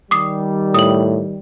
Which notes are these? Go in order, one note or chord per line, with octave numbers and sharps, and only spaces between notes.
D#3 G3 D6 D#6 C7
A2 D#6 F#7